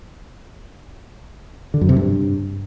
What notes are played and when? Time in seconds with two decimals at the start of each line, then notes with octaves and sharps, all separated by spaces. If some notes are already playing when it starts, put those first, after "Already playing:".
1.74 D3
1.81 F#2
1.89 C3
1.96 G2